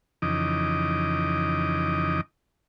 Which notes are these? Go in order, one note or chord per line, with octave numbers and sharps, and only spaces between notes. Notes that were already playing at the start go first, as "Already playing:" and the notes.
F2 C#3 E3 D#4 D#5 D6